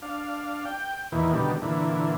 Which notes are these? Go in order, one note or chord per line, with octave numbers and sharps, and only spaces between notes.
D4 F5
G5
E2 A#2 D#3 E3
B2 D3 D#3 G3
A#2 D3 E3